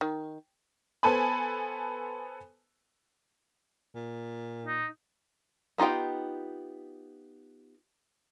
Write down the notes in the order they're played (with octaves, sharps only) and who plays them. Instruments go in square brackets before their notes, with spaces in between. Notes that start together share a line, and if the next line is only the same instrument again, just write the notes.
[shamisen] D#3
[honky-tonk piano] B3 A4 C5 G#5 A5 B5
[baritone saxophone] A#2
[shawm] D#4
[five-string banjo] B3 D#4 F4 G4 G5